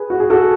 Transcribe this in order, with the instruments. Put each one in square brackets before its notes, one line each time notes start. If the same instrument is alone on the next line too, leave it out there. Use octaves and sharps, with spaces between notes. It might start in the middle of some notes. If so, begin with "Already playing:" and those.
Already playing: [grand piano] G#4 B4
F#4
G#4
F#4 A4